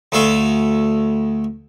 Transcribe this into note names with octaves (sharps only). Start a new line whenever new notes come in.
D2 A3 A4 F5